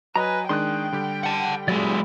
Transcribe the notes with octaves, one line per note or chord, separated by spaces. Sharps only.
F#3 B4 D#5 G#5 A#5
D#3 G#3 D4 G5 C6 D#6 F#6
D3 G3 G4
F#5 A5
F#3 G#3 E4 D5